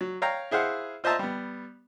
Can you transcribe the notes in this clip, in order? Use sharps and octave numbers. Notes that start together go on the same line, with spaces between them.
F#3
C#5 F5 G5 A#5
E4 G#4 C5 F5 F#5
F4 C5 D#5 E5 A5 A#5
G3 B3